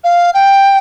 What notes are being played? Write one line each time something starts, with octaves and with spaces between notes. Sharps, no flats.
F5
G5